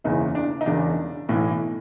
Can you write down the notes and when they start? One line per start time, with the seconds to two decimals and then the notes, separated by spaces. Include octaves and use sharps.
0.04 F#1 E2 C#3 E3 D#4
0.35 D4
0.61 D#4
0.66 E1 E2 C#3 D4
1.29 B1 A2 E3